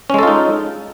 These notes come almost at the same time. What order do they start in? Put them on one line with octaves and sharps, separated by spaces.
C#4 G#3 A4 F4 D#4